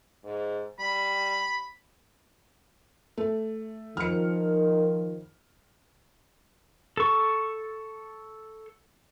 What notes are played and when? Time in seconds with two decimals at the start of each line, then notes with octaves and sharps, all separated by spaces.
0.24 G#2
0.79 G3 B5
3.18 A3
3.97 D#3 F3 F6 C#7
6.97 A4 C#6